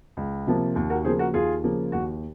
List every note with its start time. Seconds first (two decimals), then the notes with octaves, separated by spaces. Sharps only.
0.17 C#2
0.47 C3 F3 A#3
0.76 D#2
0.90 F#4 A#4
1.05 C#3 F3 A#3 G#4 C5
1.19 F#4 A#4
1.34 D#2 F4 G#4
1.64 C#3 F3 A#3
1.92 D#2 F#4